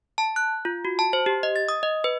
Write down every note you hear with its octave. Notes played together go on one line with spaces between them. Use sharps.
A5
F#6
F4
F#4
A5
C5
G4
D#5
A6
D#6
D#5
B4